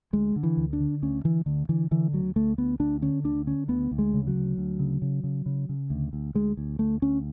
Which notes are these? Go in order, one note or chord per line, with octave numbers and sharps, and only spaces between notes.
D2 G#3
D3
E3
D2
D4
D3
D2 C#4
D3 E3
D2 D3
D3 E3
D3 E3
D2 F#3
D2 A3
D2 B3
D2 D4
D3 C#4
D2 D4
D3 C#4
D2 B3
D2
G#3
C#3
F#3
D2
D2
C#3
C#3
C#3
C#3
C#3
D2
D2
D2 G#3
D2
D2 A3
D2 C#4